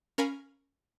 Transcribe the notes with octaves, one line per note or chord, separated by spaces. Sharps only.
C#4 A#4 F5 G#5 B5